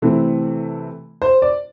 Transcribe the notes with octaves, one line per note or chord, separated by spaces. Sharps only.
C3 E3 A3 C4
C5
D5